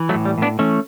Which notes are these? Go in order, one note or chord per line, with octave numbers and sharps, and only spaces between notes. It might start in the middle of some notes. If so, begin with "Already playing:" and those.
Already playing: E3
F#3 A3
A2
G3
A2 B3 D4
E3 A3 C#4